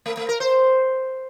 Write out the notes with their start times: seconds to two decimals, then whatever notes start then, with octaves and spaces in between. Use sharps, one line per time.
0.06 A3
0.17 A3
0.29 A#4
0.40 C5